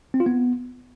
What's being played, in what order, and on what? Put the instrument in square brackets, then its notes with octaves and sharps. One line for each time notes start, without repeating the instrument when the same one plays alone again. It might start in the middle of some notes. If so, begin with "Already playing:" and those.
[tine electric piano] C4
F4
B3